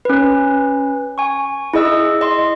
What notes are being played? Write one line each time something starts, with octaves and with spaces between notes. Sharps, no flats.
C#4 B4
G#5 C#6
E4 G#4 D#5 E6
D#5 C6